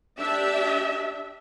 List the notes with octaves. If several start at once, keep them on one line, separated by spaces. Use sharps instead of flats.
D4 G4 E5